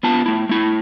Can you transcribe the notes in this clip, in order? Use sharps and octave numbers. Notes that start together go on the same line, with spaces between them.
B3 F4 A5
A3 E4
A3 E4